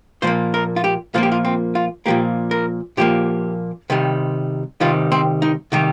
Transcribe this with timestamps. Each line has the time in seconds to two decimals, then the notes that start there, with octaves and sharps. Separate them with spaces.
0.22 A#2 F3 A#3 C5
0.54 A#4
0.76 F4
0.84 G4
1.14 A#2 F3 A#3 F4
1.23 G4
1.32 F4
1.45 C4
1.75 F4
2.06 A#2 F3 A#3 G4
2.51 A#4
2.97 A#2 F3 A#3 G4
3.90 C3 D#3 G3
4.81 C3 D#3 G3 F4
5.12 C4
5.42 D#4
5.72 C3 D#3 G3 G4